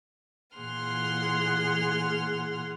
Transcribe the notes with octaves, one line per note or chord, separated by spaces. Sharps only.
A#2 E3 G#4 F#5 C6 F6